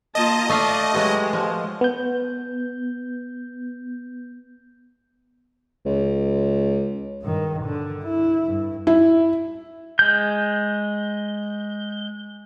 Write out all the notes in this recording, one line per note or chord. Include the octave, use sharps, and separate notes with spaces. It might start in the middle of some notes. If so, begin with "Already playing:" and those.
A#3 F4 D#5 A5
A3 D5 F5 A5
F#3 G#3 B3 G4
F3
B3 G6
C#2
G2 D#3
D3
E4
G2
E4
G#3 G6